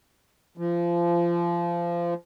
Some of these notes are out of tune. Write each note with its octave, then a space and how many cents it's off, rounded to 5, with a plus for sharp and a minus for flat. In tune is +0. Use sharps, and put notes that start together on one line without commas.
F3 -25